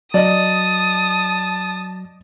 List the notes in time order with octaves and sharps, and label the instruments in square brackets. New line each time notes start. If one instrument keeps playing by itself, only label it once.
[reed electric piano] F#3 [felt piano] D5 D#5 [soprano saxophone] A5 [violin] D#6